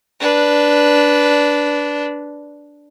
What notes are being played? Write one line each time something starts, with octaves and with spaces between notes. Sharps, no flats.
D4 B4